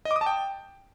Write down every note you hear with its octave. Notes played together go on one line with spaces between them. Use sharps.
D#5
D6
D#6
A5
G5